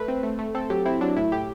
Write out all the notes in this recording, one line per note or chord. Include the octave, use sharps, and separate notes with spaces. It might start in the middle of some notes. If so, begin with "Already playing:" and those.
Already playing: A3 B4
C4
A3
A3
C4 A4
F#3 G4
C4 E4
F#3 D4
A2 E4
A2 G4